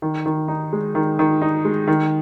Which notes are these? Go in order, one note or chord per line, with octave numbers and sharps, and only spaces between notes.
D#3
D#3
D#4
G#3
D#3
D#3
D#4
G#3
D#3